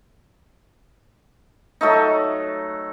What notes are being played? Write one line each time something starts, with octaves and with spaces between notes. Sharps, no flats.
F#3 A3 D#4